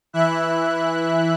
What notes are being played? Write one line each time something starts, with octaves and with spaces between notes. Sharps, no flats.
E3 E4 E5 F#6